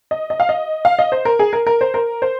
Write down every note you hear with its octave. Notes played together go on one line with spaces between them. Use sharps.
D#5
D#5
F5
D#5
F5
D#5
C5
A#4
G#4
A#4
A#4
C5
A#4
C5